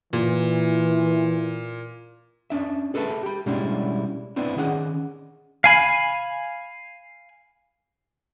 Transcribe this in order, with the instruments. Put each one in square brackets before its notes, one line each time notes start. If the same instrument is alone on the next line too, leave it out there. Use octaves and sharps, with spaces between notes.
[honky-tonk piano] A#2 [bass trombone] E3
[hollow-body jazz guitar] C#4 D4 E5
G#4 A4 B4 D#5 E5 A5
G4 B5
B2 G3 G#3 C#4 D4 E4
B3 C4 D4 E4
D#3 C#4 G#4 F#5
[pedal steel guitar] F5 G#5 B5